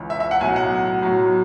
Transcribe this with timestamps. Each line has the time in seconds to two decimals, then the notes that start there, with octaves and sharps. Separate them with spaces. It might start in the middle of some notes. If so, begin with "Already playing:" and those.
Already playing: C#2 C#3 E3
0.10 E5
0.20 E5
0.31 F#5
0.40 B1 A2 F#3 G#5
0.56 F#5
1.02 B1 A2 F#3